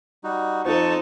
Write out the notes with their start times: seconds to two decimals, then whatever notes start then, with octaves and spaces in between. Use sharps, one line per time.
0.24 G3 D#4 F#4
0.65 F2 D#4 F4 A4 C5 C#6